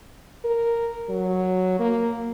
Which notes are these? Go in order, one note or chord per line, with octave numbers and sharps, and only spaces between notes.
A#4
F#3
A#3